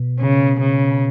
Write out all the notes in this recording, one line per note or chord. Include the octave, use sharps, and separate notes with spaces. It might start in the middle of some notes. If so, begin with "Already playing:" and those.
Already playing: B2
C#3
C#3